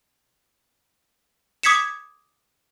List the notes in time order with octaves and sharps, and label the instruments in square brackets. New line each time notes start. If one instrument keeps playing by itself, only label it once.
[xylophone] D6 D#6 G#6 B6 C#7 E7